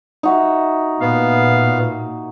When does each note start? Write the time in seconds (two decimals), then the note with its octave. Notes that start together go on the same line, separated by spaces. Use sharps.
0.23 D#4 F#4 E5
1.01 A#2 B3 F5